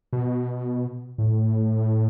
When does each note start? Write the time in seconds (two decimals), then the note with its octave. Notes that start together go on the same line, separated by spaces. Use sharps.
0.13 B2
1.18 A2